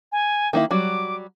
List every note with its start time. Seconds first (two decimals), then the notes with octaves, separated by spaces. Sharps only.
0.12 G#5
0.53 D#3 A#3 E4
0.71 F#3 G3 F#4 D6